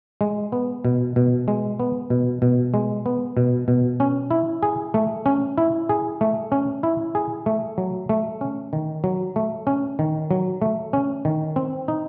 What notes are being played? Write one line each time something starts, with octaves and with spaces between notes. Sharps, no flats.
G#3
B3
B2
B2
G#3
B3
B2
B2
G#3
B3
B2
B2
C#4
E4
G#4
A3
C#4
E4
G#4
A3
C#4
E4
G#4
A3
F#3
A3
C#4
D#3
F#3
A3
C#4
D#3
F#3
A3
C#4
D#3
C4
D#4